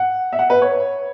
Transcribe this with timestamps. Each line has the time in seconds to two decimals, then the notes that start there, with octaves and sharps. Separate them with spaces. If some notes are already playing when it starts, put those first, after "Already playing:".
Already playing: F#5
0.33 E5
0.39 F#5
0.50 B4
0.62 C#5